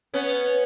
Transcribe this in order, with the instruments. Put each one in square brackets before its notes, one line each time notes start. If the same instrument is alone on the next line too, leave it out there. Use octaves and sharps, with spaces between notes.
[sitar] B3 C#4